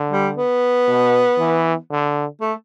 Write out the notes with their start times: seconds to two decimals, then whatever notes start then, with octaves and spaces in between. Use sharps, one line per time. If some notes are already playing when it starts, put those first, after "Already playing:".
Already playing: D3
0.11 G3
0.37 B3
0.88 B2
1.39 E3
1.90 D3
2.41 A3